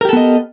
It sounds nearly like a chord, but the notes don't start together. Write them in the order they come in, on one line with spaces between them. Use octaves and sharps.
A#4 G4 A4 B3 D#5